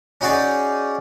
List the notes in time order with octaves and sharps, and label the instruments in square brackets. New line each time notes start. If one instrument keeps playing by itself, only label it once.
[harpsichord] C#4 D#4 F#4 G#4 D5